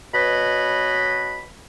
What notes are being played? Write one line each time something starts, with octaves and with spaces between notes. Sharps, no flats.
B2 B4 C#5 D#5 B5